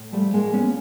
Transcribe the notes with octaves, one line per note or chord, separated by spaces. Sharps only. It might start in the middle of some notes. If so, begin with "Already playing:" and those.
Already playing: A2
F3 G3 A3
A2 G#3 A#3
F3 B3 C#4